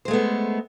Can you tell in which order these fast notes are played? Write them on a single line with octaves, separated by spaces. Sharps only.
C5 G#3 A3 B3